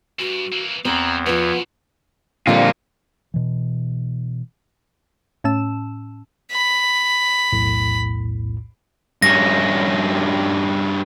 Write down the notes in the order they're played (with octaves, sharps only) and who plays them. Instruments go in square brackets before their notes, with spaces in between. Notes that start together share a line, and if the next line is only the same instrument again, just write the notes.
[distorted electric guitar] E2 G2 [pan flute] F#4
[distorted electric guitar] E3 A#3
[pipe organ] E2 [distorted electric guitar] F3 [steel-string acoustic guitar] C4 [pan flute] A#5
[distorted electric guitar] F#2 B2 [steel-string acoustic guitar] F3 B3 [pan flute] F4
[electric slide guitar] F2 A#3 F4 [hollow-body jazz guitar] A#2 D3 G3
[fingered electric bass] B2 E3
[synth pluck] A2 C#4 A5 E6 E7
[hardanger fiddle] B5
[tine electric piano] B1 E2 A2
[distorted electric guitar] G2 C#4 [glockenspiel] A#6